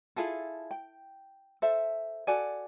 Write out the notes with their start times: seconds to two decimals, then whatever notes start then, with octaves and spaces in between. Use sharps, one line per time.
0.16 E4 F4 G#4 A4
0.71 G5
1.62 A4 C5 E5
2.27 F#4 A4 D5 G#5